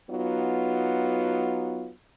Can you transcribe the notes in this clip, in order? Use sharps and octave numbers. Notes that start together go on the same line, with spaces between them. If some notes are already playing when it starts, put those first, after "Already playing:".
F#3 B3 D#4 F4